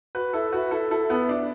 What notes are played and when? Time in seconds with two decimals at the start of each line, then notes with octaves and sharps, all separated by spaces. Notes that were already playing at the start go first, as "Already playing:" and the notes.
0.15 F#4 B4
0.33 E4 A4
0.52 F#4 B4
0.71 E4 A4
0.91 E4 A4
1.09 B3 E4
1.29 D4